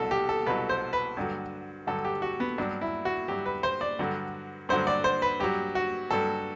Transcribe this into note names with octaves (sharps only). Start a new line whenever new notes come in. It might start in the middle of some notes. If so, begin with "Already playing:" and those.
Already playing: C2 B2 F#3 A4
G4
A4
C2 B2 F#3 B4
C5
B4
G2 D3 F#3
G2 D3 F#3 A4
G4
F#4
B3
G2 F#3 D4
E4
F#4
G2 F#3 G4
B4
C5
D5
G2 D3 F#3
G2 D3 F#3 C5
D5
C5
B4
G2 F#3 G4
F#4
G2 F#3 A4